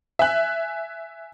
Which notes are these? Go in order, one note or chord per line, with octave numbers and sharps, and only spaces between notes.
E5 G#5 F#6